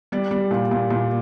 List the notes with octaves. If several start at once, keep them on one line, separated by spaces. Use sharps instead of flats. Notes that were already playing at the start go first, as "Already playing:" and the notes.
G3 D5
G3
A#2
A#2
A#2